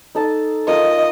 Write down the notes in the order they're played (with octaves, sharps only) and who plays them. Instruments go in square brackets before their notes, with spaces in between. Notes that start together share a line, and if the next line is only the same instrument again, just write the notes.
[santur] D#4 A4 A5
[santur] F4 A#4 [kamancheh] D#5